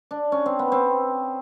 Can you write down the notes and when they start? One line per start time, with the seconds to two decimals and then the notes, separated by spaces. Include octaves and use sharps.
0.11 D4
0.32 C#4
0.46 C4
0.59 B3
0.72 C4